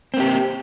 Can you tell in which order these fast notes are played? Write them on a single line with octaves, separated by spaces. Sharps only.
C4 A#3 G4